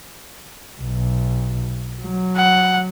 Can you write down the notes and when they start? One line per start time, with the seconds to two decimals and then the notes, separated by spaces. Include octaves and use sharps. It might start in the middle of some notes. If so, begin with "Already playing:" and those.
0.81 B1
2.02 F#3
2.36 F#5